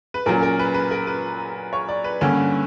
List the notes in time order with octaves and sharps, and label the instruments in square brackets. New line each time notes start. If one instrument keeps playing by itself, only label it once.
[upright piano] B4
A#2 F#3 C#4 A#4
A#4
B4
B4
A#4
B4
C#5
D5
B4
G2 D3 A#3 C#4